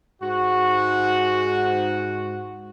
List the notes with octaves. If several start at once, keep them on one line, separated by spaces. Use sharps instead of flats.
G#2 F#4